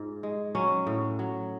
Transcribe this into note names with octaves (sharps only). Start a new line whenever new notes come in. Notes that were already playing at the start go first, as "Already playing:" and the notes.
Already playing: G#2 F4
G#3
F#3 C#4
A2
F#3